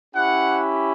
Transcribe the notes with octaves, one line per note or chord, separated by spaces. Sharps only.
C#4 E4 G4 F#5